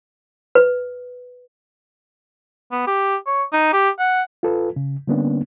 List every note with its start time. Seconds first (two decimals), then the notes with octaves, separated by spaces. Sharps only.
0.55 B4
2.72 B3
2.87 G4
3.26 C#5
3.53 D#4
3.73 G4
3.99 F#5
4.43 F4 A4 B4
4.76 C#3
5.07 D3 G3 A#3 B3 C#4 D4